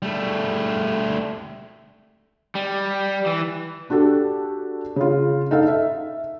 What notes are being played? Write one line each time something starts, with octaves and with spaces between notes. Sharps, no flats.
G3 A3
G3
E3
D4 F#4 G4 A4
C#3 F4
D#4 A4 F5
E5